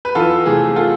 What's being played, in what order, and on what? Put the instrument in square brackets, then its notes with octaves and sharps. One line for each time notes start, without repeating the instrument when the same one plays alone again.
[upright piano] B4
E2 F4 A4
C3 E3 A3 G#4
F4 A4